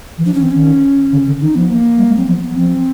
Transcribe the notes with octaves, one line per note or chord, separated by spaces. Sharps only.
E3
F3 D4
C#4
E3 C4
D#3 C#4
D3
D3
D#3 D#4
F3 B3
A#3
G3
G#3
F#3 C4
F3 B3
B3
F#3
F3 C4